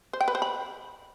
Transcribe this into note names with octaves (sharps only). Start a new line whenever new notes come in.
C5
G5
B4
C5
B5